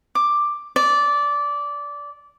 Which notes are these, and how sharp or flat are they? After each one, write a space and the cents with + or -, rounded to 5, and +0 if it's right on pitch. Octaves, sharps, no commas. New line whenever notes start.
D6 +5
D5 -15